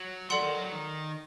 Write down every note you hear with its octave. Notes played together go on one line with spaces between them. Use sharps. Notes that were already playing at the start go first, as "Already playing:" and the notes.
Already playing: F#3
F#3 A4 D5 F#5 C6
D#3
F#3
F#3
D#3